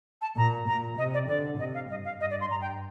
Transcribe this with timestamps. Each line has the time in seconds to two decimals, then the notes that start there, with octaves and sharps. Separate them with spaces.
0.22 A5
0.37 A#2 A#5
0.67 A#2 A#5
0.98 C3 D#5
1.14 D5
1.29 D3 D5
1.59 C3 D#5
1.74 F5
1.90 G2 D#5
2.05 F5
2.20 G2 D#5
2.31 D5
2.41 C6
2.51 G2 A#5
2.61 G5